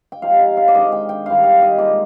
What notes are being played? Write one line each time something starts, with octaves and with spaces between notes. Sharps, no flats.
G5
C3 F3 C4 D#4 F5
F5
F5
D5
D#3 G#3 D4 D#5
G5
G5
D#3 G3 C4 D#4 F5
F5
D#5
A#2 G#3 D#4 D5